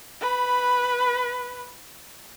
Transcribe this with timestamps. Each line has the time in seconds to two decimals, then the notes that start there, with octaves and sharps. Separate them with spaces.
0.21 B4 B5